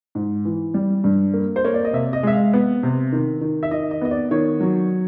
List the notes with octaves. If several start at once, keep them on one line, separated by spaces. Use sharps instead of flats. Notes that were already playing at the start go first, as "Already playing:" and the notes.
G#2
E3
G3
G2
A#3
C5
A#3 C#5
D5
D#5
C3 E5
D#5
G#3 E5
F5
B3
C3
D#3
D#3
E5
D#3 D#5
D#5
B3 D#5
D5
D#3 C#5
F#3